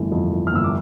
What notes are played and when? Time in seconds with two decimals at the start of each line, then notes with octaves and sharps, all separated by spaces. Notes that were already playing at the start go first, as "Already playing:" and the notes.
Already playing: G1 F2 E3 A3
0.12 F2
0.32 E3
0.47 F6
0.53 G1 E6
0.64 D6